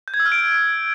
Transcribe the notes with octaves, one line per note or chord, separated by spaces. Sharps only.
G6
G#6
E6
F6
D7